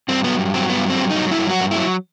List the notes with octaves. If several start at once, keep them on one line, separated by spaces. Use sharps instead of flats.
G2 C4
F#3 B3
G2
F#3 C4
G2 B3
F#3
C4
G2
D#4
F#3
G2 E4
F#3 F#4
G2
F#3 E4